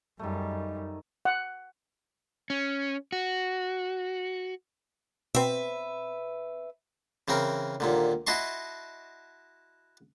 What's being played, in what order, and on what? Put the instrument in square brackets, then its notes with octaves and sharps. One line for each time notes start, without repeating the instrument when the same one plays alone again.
[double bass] F#2 G3 [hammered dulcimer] D#3 A3
[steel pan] F#5
[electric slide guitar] C#4
F#4
[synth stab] B2 C4 [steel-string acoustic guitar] B4 E5
[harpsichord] C#3 E3 C4 A#4
D#2 A#2 D3
E4 F#4 D#5 A5 C6 C#6